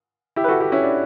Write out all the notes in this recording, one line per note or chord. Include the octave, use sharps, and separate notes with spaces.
E4 G4
B4
F#4 A4
E4 G4
C#4 E4
D4